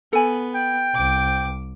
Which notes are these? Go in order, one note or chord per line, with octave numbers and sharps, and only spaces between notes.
B3 A4 G#5
G5
C2 D6